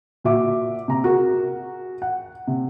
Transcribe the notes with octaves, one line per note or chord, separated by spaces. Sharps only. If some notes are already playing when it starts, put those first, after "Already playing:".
A#2 F#4 E5 D6
C3 A#5
F#4 G#4 A#4
F#5
C3